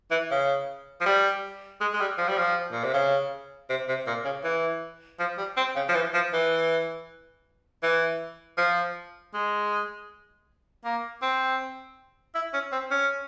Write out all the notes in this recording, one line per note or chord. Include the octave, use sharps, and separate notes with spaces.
E3
C#3
F3
G3
G#3
G#3
G3
F3
G3
F3
A#2
C3
C#3
C3
C3
A#2
C#3
E3
F3
G3
C4
C#3
F3
E3
F3
E3
E3
F3
G#3
A#3
C4
E4
C#4
C4
C#4